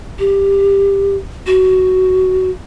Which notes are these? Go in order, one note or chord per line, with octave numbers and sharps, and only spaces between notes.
G4
F#4